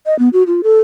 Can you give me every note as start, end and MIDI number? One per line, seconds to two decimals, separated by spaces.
0.06 0.17 75
0.19 0.29 59
0.33 0.43 66
0.47 0.61 65
0.63 0.80 69